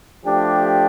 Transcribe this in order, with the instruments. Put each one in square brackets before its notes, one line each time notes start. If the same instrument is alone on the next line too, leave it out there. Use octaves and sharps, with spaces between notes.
[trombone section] F3 A3 D4 G4